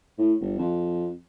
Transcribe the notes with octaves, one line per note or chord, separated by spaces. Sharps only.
A2
G1
F2